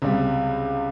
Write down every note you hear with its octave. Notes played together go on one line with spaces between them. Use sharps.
C#2 C3 G3